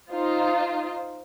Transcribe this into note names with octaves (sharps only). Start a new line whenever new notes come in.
D#4 F4 C5